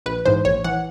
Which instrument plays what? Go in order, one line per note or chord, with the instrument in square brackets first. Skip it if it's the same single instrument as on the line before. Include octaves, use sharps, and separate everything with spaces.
[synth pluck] A#1 B4
G#2 E3 C5
A#1 C#5
E3 F#5